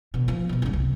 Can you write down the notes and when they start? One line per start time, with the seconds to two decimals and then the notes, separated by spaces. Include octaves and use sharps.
0.14 B2 D3
0.28 F3
0.49 B1 B2
0.62 F#1 G3
0.73 C2